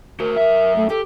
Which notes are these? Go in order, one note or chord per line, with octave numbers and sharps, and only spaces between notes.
F#4 A#4 C5
F#2 E5
A3
G4 A4